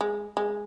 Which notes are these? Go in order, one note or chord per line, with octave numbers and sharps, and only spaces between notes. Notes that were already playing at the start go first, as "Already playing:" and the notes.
G#3
G#3